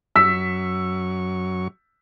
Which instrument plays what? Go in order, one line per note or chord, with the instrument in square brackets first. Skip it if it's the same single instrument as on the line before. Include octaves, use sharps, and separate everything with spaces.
[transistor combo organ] F#2 F#3 C#6 [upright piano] E6 B6